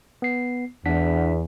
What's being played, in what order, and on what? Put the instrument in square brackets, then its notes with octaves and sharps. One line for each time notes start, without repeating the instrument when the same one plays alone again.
[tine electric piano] B3 C7
[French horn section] E2 [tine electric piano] D4 F#5 B6